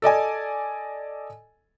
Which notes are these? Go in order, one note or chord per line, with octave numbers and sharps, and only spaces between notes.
A4 D5 D#5 G#5